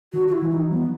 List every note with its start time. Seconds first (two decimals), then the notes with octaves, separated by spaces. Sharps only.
0.13 D#3 F#4
0.28 F#4
0.32 E4
0.42 E3
0.51 D#4
0.70 F#3 B3